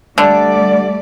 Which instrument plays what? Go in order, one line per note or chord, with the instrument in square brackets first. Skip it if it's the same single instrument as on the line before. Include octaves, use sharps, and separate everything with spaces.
[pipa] D3 [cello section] G3 A3 D5